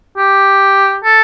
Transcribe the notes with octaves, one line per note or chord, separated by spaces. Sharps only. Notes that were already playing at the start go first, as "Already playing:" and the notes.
G4
A4